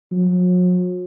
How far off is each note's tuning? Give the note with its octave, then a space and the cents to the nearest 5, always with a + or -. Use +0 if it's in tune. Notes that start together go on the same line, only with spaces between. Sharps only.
F#3 -45